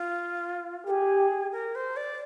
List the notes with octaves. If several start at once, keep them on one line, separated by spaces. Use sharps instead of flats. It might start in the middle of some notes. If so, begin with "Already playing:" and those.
Already playing: F4
G4 G#4 A#4
A#4
C5
D5